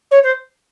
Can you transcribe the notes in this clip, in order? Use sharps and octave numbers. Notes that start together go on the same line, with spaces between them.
C#5
C5